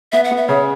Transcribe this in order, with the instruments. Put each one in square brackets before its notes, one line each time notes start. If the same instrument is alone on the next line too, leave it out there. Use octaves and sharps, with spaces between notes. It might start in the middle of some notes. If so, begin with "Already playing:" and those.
[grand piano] B3 [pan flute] E5
[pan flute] F#5
[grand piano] B3
[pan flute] E5
[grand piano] C#3 [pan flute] C#5